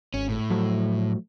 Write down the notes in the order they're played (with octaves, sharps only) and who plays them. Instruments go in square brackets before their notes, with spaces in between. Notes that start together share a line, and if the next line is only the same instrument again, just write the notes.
[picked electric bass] G#1 [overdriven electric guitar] C#4
[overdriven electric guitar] A2
[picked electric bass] F3 F#3 A3